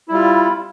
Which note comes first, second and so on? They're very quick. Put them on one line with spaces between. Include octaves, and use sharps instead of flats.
E4 G3 F4